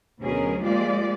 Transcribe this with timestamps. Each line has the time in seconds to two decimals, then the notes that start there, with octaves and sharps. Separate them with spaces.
0.21 D2 B2 F#3 C#4 G#4 A#4
0.60 F3 G#3 A#3 F4 G4 D5